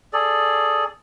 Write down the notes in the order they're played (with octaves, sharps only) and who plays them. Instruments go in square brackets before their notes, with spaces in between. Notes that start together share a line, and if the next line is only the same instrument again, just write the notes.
[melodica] G#4 A4 D5